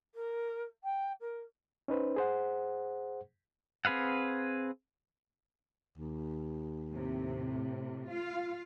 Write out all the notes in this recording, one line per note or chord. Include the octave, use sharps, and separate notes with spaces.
A#4
G5
A#4
C#4 D#4 B4 C5
G#4 C5 F#5
C4 G#4 B4 F5 F#5
D#2
A2 C3
F4 F5